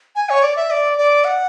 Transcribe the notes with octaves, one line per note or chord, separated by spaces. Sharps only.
G#5
C#5
D5
E5
D5
D5
F#5